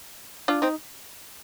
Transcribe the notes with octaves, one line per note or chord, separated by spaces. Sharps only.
D4 F4
C4 D#4